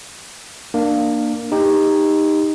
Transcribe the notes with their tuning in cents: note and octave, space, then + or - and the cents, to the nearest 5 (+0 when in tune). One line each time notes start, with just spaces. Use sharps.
A#3 +0 D4 +25
D#4 +0 G4 +20